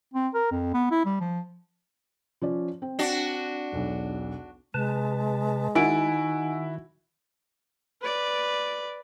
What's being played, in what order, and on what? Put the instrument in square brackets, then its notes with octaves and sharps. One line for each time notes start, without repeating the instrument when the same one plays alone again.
[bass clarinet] C4
A#4
F2
B3
E4
G3
F3
[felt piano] F3 C#4 D5
C4
[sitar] D4 F#4
[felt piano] E1 B1
[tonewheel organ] C3 B4 A5 [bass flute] G#3
[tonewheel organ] D#3 [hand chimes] D#4 G#5 D7 [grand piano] E4 F#4
[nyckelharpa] B4 D5